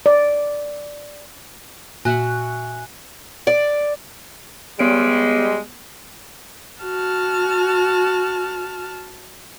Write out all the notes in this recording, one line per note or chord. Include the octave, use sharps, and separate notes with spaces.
D5
A#2 F#4 E5 F#5 G#5 F#6
D5
G3 G#3 B3 C#5 D7
F#4 A5 F6